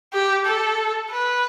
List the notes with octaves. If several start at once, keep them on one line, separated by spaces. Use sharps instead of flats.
G4
A4
B4